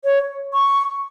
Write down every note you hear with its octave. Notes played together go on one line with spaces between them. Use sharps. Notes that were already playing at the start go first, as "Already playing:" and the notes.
C#5
C#6